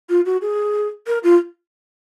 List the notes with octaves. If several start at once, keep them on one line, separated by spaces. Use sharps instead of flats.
F4
F#4
G#4
A#4
F4